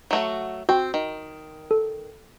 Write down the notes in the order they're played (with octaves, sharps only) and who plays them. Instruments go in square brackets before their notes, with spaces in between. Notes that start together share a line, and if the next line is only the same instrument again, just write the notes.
[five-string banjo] F#3 A3 F#4
[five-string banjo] C4 [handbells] F#4 G5
[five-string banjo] D#3
[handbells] A4